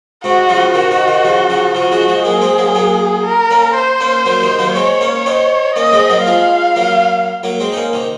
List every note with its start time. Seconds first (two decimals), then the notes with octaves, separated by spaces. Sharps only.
0.24 G#2 C3 F#4
0.49 C#3 F3
0.74 C3 D#3 F#4
0.91 C3 D#3
1.07 C3 D#3
1.25 C#3 F3
1.50 C#3 F3
1.75 C#3 F3 F#4
1.91 F3 G#3
2.08 F3 G#3
2.25 F#3 A#3 G#4
2.41 G#3 C4
2.58 F#3 A#3
2.75 F#3 A#3
3.25 A#4
3.50 A#3 C#4
3.75 C5
4.00 A#3 C#4
4.26 F#3 A#3
4.42 C3 D#3
4.59 F#3 A#3
4.75 G#3 C4 C#5
5.01 A#3 C#4
5.26 C4 D#4
5.76 A#3 C#4 D#5
5.86 C#4
5.93 G#3 C4
6.10 F#3 A#3
6.26 F3 G#3 F5
6.76 F#3 A#3
7.43 F#3 A#3
7.60 G#3 C4
7.72 D#4
7.76 A#3 C#4
7.93 C3 D#3